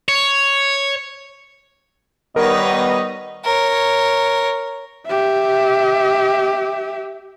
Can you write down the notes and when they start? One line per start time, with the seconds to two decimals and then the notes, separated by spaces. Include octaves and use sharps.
0.08 C#5
2.36 D#3 G3 B3 D#4 A#4 B4 C#5 D#5
3.45 A#4 C#5
5.06 G4 E5